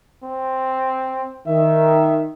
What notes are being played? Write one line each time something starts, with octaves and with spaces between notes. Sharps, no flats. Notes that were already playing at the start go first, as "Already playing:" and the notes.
C4
D#3 E5